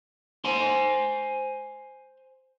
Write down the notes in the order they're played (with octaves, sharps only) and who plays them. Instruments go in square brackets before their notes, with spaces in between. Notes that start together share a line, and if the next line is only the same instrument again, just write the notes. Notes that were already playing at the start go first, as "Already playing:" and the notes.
[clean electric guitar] C5 G#5 C6